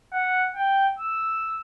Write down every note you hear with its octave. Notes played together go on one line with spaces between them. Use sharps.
F#5
G5
E6